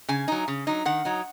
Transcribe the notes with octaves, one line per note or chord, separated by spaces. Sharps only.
C#3 G#5
F#3 D#4
C#3
F#3 D#4
D#3 F#5
F#3 D#4